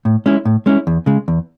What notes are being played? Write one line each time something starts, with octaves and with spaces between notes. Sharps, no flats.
A2
G#3 C#4 E4
A2
G#3 C#4 E4
E2
C#3 G#3
E2